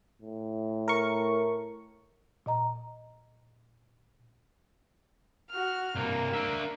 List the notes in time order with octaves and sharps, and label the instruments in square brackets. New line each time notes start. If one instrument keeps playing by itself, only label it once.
[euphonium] A2
[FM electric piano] A#4 C#6
[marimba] A#2 D#5 A#5
[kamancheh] F#4 F6
[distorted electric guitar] C2 G2 [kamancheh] A#3
[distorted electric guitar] D4 E5